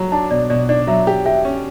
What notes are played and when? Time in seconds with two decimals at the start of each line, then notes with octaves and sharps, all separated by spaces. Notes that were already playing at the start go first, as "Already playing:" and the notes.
Already playing: F#3
0.12 D4 A5
0.31 B2 D5
0.50 B2 D5
0.69 D4 D5
0.87 F#3 E5
1.07 G4
1.26 G4 E5
1.45 C#4